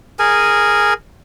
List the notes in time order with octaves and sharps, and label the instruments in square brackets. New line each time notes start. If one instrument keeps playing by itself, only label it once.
[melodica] G#4 A#4 G#5